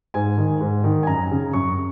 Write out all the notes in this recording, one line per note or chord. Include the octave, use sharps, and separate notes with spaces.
G#2 G#5
D#3
G#2
D#3
G#5
F#2 A#5
C#3
F#2 C#6